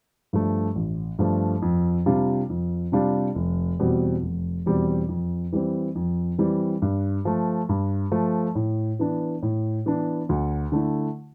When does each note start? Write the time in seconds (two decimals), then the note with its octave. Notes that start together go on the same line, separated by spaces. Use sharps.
0.33 G2 F3 A3
0.75 A1
1.19 G2 F3 A3
1.62 F2
2.06 C3 G3 D4 F4
2.50 F2
2.92 C3 G3 D4 F4
3.35 F1
3.79 E2 B2 G3 C4
4.22 F1
4.66 E2 B2 G3 C4
5.09 F2
5.53 E3 G3 C4
5.95 F2
6.38 E3 G3 C4
6.82 G2
7.25 F3 A3
7.69 G2
8.12 F3 A3
8.55 A2
8.99 E3 B3 D4
9.43 A2
9.86 E3 B3 D4
10.29 D2
10.72 D3 A3 E4